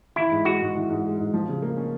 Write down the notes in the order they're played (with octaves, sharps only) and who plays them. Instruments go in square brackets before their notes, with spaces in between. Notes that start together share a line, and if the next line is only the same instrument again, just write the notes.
[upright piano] E3 [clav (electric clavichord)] E4
[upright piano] G#2
[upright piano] G#3 [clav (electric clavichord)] F#4
[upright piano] G#2
E3
G#2
G#3
G#2
F3
C#3
A#3
C#4